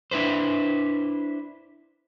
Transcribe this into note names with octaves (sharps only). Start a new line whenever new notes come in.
D4 E4 B4 C5